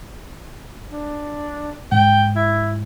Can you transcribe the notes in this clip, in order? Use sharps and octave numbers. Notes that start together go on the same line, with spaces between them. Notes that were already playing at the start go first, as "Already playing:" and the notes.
D4
G#2 G5
E4